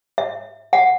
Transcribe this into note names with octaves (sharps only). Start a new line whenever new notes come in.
E5
F#5